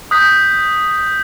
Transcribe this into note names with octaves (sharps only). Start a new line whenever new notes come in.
D#6 F#6 G6 B6